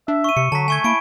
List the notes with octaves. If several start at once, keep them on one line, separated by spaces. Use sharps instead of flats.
D4 E5
C#6 D#7
C3 C#7
D3 F#3 A5 B6
A3 G#5 C#6 G#6
A#3 E4 C#6 D7